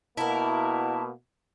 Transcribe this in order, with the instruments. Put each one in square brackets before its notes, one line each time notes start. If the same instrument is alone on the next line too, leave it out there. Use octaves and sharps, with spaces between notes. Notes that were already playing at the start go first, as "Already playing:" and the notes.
[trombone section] B2 A#3 [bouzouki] E4 A#4 [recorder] A5